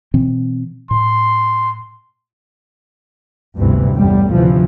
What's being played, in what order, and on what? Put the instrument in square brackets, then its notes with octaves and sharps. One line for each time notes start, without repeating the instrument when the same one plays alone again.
[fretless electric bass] B2 E3 C4
[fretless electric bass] A2 [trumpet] C6
[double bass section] G1 D2 G2 C3 E3
A1 E2 G2 G3
D2 C3 E3 F3